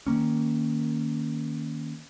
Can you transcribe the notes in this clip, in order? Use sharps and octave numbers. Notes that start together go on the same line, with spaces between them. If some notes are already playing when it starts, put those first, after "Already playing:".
D#3 F3 A#3 C#4